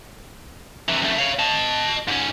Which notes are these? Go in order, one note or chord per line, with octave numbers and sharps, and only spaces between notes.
C3 E3
F#2 A3
C#5 F5
D#5 A5
G#2 C#4